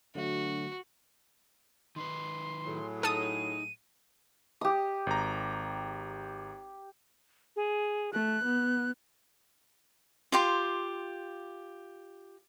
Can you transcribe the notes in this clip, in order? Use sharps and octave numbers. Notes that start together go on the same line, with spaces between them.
D3 F#3 A3 D4 F#4
D#3 D#4 B4 C6
A2 F#3 G#4
D#4 A4 D#6 D#7
G4 D#6
G#1 A#5
G#4
A3 F#6
B3
F4 G4 C6